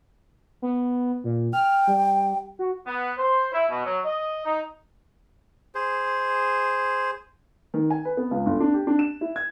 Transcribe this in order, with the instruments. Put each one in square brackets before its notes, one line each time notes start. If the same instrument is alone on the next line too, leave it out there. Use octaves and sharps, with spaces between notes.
[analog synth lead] B3
A#2
[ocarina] G5 [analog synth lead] F6
[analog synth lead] G3
F#4
[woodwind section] B3
C5
E4
B2
F#3
D#5
D#4
[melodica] G#4 C5
[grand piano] D#3
G#5
B4
B3
C#2
G1
D4
G4
D4
E7
E4
G#6